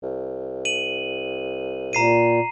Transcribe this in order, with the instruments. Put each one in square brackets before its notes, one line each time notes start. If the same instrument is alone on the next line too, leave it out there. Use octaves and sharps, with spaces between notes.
[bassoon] C2
[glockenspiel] D#7 F#7
[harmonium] A#2 [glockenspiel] A#5 C7 D#7